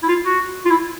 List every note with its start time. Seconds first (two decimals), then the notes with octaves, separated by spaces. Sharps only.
0.03 E4
0.08 F4
0.25 F#4
0.65 F4
0.70 E4